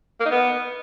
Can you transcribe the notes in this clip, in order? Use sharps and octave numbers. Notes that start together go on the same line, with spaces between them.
A#3
D#4
B3